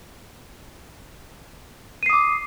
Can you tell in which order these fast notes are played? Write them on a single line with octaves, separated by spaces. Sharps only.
D#7 C7 D#6 D6